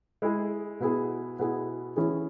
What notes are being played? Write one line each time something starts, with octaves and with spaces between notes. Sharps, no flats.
G#3 E4 G#4
B2 B3 E4 G#4
B2 B3 E4 G#4
E3 C#4 E4 G#4